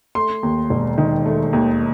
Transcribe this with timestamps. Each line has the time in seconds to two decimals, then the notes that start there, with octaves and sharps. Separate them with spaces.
0.15 A3 C6
0.43 D#2
0.70 E1
0.98 D#3
1.25 A3
1.53 D#2